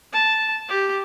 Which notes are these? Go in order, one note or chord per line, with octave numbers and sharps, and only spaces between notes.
A5
G4